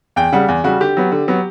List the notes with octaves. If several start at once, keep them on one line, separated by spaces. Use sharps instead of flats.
E2 G5
C#3 G3 F#5
E2
C#3 G3 F#4
D3 G4
F#3 B3
D3
F#3 B3